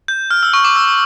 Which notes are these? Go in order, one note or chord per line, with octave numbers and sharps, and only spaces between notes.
G6
F6
E6
C#6
D6
E6